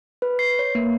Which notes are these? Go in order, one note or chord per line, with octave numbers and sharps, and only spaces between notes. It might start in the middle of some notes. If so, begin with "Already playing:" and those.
B4
C7
C#5
A#3